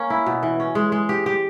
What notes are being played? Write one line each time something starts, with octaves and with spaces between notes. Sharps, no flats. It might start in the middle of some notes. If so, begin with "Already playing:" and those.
Already playing: A#3 C#4
E4
B2
E3
C#4
G#3
G#3
G4
G4